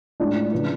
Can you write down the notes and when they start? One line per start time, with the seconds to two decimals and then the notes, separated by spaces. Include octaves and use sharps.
0.20 A2 G#3 D4 F4
0.52 C#3 F3 B3 D4